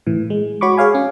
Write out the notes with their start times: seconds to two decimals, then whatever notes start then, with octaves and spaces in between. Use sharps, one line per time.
0.06 A2 E3
0.30 G#3
0.61 F#4 C#5 B5 C#6 D6
0.77 G#4 C#5 F5 G#5
0.95 C#4